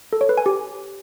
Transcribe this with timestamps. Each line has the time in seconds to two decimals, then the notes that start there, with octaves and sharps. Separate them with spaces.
0.13 A4
0.21 C#5
0.29 B4
0.38 G#5
0.46 G4